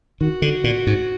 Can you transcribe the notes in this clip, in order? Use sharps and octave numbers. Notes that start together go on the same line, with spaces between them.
D#3 F#4
D3
A#2
G#2